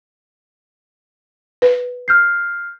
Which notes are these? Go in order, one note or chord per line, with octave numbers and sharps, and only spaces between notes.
B4
F6 G6 C7